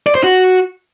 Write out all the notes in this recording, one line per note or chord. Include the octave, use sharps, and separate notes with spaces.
D5
C5
F#4